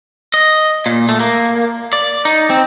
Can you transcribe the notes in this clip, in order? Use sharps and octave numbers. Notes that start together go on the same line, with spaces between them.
D#5
A#2
A3
A#3
D5
D#4
C4